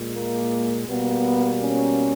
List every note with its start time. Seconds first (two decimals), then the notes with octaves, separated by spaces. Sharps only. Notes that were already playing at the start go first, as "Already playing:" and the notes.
Already playing: A#2 G#3
0.14 A#3
0.88 B2 G3 A#3 B3
1.62 C#4